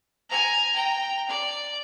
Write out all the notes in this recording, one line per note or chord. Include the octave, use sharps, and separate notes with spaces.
G#5 A#5
G5 A#5
D5